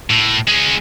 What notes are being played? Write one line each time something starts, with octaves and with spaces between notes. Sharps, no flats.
A2
G#3 C#4